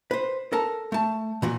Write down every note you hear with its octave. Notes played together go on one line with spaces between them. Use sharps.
B4 C5
A4 A#4 A5
A3 A5
A#2 E3 F#4